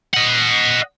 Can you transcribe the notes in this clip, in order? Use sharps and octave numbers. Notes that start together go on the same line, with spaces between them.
D#5 F#5